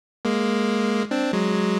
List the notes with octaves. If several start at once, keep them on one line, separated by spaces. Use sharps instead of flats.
G#3 A#3
C4 D4
F#3 G#3